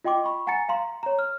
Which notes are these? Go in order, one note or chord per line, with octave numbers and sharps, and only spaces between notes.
F4 D#5 G5 C6 D6
B5 C#6
F#5 G#5 A#5 A6 C#7
F5 A#5 C6
C#5 A#5
F6